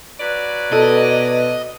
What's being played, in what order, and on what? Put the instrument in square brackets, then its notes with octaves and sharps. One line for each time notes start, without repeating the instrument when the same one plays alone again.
[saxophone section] F#3 B4 D5
[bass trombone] B2 [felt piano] A4 [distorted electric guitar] D#5